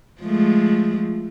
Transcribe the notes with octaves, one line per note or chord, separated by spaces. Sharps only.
F3 G#3 A3